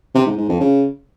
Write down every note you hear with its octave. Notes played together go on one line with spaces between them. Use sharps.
C3
G#2
G#2
F2
C#3